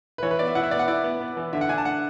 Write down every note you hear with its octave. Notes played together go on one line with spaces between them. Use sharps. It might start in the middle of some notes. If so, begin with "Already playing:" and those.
B4
E3 C#5
B4
B3 D5
E5
E4 F#5
E5
B3 D5
F#5
E4 D5
B3
B3
E3
D3 E5
F#5
D4 G#5
A5
D4 F#5